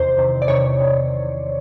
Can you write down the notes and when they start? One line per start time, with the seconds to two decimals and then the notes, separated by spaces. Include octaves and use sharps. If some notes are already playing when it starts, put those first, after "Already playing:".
Already playing: E2 C3 D#3 C5
0.18 E2 C3 D#3
0.42 D5
0.48 E2 C3 D#3 C#5
0.80 C3 D#3